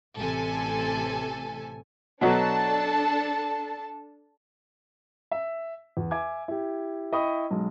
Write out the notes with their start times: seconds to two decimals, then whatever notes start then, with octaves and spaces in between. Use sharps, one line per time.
0.16 A1 C3 A4 G#5
2.21 B2 F#3 D4 A4 A5
5.31 E5
5.97 E2
6.11 E5 G#5 D6 G#6
6.48 E4 G4
7.12 E4 D#5 G5 B5 C#6 D#6
7.51 B1 G#3